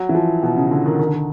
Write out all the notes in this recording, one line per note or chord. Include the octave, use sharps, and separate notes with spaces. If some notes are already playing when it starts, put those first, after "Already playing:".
Already playing: F#3
E3
F3
B2
C#3
D3
D#3
D#3
D3
D#3